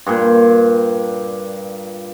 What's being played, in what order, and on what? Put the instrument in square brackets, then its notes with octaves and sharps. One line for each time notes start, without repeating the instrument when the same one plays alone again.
[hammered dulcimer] G2 A#2